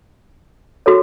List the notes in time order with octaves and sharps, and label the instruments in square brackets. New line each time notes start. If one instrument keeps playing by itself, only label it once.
[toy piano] F#4 A4 C#5